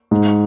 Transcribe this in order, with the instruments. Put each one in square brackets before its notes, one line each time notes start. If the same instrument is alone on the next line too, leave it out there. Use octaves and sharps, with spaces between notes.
[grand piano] G#2